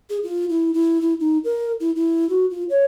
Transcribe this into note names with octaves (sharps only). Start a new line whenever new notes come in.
G#4
F4
E4
E4
E4
D#4
A#4
E4
E4
F#4
F4
C#5